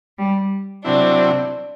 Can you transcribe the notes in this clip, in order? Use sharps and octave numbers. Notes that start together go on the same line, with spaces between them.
G3
C3 F#3 C4 D4 E4